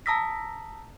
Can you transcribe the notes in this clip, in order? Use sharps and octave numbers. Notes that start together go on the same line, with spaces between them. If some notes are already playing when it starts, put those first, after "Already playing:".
A5 A#5 D#6 E6 A#6 B6